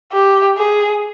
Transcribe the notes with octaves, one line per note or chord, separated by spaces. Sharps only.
G4
G#4